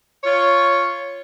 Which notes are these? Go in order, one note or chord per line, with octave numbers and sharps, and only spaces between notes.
F4 C#5